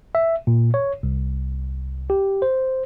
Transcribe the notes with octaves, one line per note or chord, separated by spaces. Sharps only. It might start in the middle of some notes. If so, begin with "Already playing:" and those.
E5
A#2
C#5
C2
G4
C5